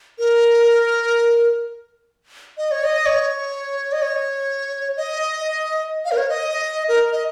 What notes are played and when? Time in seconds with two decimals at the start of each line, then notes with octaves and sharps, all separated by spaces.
0.19 A#4
2.58 D#5
2.71 C#5
2.84 D#5
3.06 C#5
3.92 D#5
4.02 C#5
4.97 D#5
6.05 F5
6.11 A#4
6.17 C#5
6.29 D#5
6.88 A#4
7.12 D#5